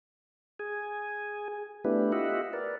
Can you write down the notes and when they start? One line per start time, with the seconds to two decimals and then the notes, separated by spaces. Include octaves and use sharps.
0.59 G#4 G#5
1.85 A3 B3 D4 E4 G4 B4
2.12 F4 G4 D#5 E5 F#5
2.53 A#4 B4 D5